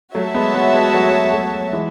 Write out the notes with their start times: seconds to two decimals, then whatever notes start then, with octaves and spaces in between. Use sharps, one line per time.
0.15 F#3 A3 F#4 C#5 E5 A5
0.34 G#3 B3
0.54 G#3 B3
0.74 G#3 B3
0.94 F#3 A3
1.33 F#3 A3
1.73 E3 G#3